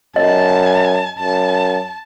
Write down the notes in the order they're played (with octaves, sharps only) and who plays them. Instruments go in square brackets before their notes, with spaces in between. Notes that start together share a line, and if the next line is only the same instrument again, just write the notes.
[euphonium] F#2 [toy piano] D#5 [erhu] A5
[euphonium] F#2 [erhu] A5